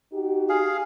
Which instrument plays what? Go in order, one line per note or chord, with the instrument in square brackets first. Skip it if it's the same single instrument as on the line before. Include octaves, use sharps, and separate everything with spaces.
[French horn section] D#4 F#4 G4
[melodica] G#4 F5